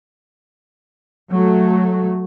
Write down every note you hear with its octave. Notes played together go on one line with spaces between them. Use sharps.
F#3 A3